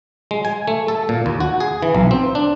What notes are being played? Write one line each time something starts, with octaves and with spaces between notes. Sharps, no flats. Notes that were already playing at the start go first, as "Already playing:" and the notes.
G#3
G#5
A3
A4
A#2
D#2
F#4
G#4
E3
B1
C4
D4